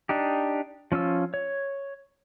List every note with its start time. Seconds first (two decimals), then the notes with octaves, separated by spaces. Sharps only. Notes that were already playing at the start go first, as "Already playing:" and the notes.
0.09 D4 D#4 G4
0.92 F3 C#4 F4 E6
1.34 C#5